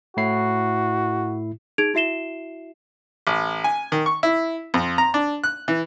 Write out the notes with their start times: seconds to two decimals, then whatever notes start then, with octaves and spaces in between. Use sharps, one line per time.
0.17 A2 E4 F#4 C7
1.78 D#4 G#4 G#6 D7 F7
1.94 E4 F#4 E5 C7 E7 G7
3.27 A1
3.64 G#5
3.92 D#3
4.06 C#6
4.23 E4
4.74 F2
4.98 A#5
5.14 D4
5.44 F#6
5.68 E3